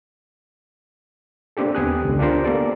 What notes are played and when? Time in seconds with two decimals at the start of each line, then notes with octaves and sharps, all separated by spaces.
1.57 A#3 C4 D4 G4 A4
1.75 D#2 B3 G4 G#5 D#6 F#6
2.05 C#2 D3
2.19 D4 F4 G4 A#4 C5
2.45 A#3 B3 A4 D5